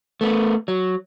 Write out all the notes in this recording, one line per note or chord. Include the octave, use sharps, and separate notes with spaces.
A3 B3
F#3